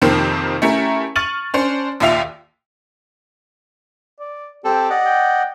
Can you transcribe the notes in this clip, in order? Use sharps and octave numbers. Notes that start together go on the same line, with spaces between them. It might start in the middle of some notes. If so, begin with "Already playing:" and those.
F2 C3 D#3 F3 A#3 C4
A3 C#4 E4 G4 A#4
C#6 F6 A6 D#7 F#7
C#4 D4 C5
A#1 D#2 F4 E5 F5 F7
D5
C4 G4 A4
D5 D#5 F#5
G5